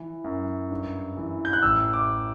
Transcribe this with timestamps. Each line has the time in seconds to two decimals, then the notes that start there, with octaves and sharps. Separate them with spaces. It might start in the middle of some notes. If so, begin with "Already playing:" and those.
Already playing: E3
0.24 F#2
0.71 G2
1.17 E3
1.45 G6
1.53 F#6
1.62 A1 E6
1.93 D6